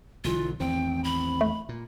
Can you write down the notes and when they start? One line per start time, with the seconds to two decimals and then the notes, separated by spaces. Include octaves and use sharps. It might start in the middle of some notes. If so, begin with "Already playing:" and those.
0.24 B1 D3 E3 F#3 F4
0.60 A1 E2 D#3 C4 G5
1.04 B5
1.41 A3
1.69 A#2